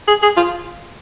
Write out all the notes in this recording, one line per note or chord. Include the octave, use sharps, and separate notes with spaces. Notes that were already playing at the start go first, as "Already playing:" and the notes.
G#4
G#4
F4